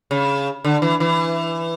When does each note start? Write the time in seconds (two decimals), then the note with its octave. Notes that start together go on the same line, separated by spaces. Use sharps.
0.11 C#3
0.65 D3
0.82 E3
1.00 E3